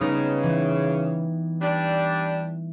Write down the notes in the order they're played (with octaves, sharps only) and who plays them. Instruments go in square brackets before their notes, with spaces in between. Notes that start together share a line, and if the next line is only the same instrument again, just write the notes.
[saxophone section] C#3 [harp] G3 B3 D#4
[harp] E3
[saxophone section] G3 D4